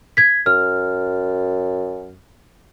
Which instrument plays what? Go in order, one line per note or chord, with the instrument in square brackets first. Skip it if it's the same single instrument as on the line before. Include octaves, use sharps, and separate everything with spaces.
[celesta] G#6 B6
[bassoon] F#2 [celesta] F6